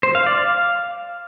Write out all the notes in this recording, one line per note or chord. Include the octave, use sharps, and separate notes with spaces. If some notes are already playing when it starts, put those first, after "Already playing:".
C5
F5
D5
F5